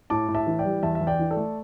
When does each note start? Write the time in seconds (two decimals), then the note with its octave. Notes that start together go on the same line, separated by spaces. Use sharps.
0.10 A2 A5 D6
0.29 A2
0.35 E5 A5
0.47 E3
0.59 D5 G5
0.65 G3
0.83 E2 E5 A5
0.95 E5
1.01 E2
1.07 D5 G5
1.19 E3
1.31 A4 D5
1.37 A3